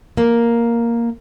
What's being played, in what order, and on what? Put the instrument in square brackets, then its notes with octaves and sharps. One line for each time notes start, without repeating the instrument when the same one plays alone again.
[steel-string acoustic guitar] A#3